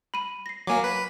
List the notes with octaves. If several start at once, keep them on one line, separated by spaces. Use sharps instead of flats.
B5 D#7
A#6 C7
F#3 A#3 F5 G#5 D6
B4